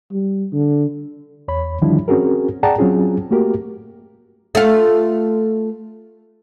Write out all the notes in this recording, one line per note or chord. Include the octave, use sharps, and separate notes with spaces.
G3
D3
E2 C#5 B5
D3 D#3 F3 G3 D4 E4
C4 C#4 F#4 G#4 A#4
G#4 D5 F#5 G5 A5 A#5
F#3 C4 C#4 F4 G#4
A3 A#3 F#4 G4 A#4
A3 F4